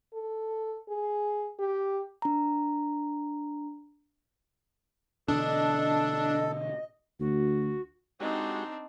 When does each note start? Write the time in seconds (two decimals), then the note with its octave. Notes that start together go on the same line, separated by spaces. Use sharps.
0.14 A4
0.89 G#4
1.59 G4
2.22 D4 A#5
5.28 B2 D3 E3 D4 A4 D#5
7.20 D2 F#4
8.20 G#3 C4 D4 D#4 F#4 G4